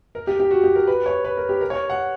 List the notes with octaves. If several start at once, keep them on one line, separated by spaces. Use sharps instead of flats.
A#4
G4
G4
F#4
G4
A#4
B4
C#5
B4
A#4
G4
A#4
C#5
F#5